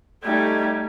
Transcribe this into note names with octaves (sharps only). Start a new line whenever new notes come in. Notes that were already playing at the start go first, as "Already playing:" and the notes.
G3 A3 D#4 G#6